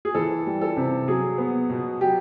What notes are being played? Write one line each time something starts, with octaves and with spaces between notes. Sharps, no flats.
G#4
E3 A4
G3
A4
C3
F#3 G#4
B3
B2
F#3 G4